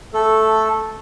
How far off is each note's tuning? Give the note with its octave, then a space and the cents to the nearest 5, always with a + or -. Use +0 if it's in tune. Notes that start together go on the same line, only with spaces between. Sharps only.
A3 +0 A4 -5